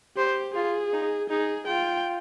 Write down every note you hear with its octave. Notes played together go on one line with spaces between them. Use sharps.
G4 C5
F4 G#4
D#4
D#4 G#4
F4 G5